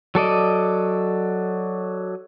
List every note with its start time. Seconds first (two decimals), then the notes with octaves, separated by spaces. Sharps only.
0.15 F#3 A4 D5 D#5